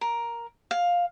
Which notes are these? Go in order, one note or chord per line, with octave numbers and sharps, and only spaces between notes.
A#4
F5